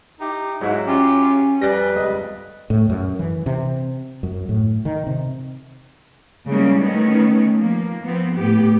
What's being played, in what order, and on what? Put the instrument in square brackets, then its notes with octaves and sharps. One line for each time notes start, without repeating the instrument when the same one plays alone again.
[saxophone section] D#4 E4 G4
[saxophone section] G#2 [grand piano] F#3 E4 F#4
[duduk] C#4 [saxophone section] F4 G4
[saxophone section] F2 B4 [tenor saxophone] G3 [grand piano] G#5 A6 A#6
[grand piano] G1 C#2 D#5
[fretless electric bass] A2
F#2
E3
C3
F#2
A2
D#3
C3
[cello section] C#3 G3 G#3 A#3 C#4 E4
D#3 A3 B3 C#4
F3 A#3
F3 B3 C4
A2 B3 G4